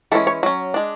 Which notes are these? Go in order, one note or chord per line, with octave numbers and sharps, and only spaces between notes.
E3 G#3 C#4 A4
C#5
F#3 C#4
G#3 D4